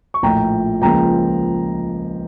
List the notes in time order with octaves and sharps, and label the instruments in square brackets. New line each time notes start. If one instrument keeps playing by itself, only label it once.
[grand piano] C#6
A#1 A2 F3 G5 A#5
C#2 C#3 F3 A#3 G5 A#5